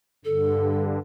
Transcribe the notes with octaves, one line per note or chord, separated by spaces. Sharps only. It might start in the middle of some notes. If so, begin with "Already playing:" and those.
G2 D3 A4